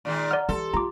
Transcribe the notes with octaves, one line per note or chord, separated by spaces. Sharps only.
A#2 D#3 G#3
D5 F#5 A#5 F6
E3 G4 A4 C6
F4 A#5 D6